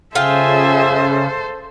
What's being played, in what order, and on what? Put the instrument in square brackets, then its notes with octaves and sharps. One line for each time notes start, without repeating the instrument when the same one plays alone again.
[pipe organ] C#3 [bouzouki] F4 G5 [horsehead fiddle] G#4 E5 [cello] A4 C5